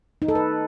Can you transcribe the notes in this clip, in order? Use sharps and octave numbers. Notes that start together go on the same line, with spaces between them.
D#4
A4
B4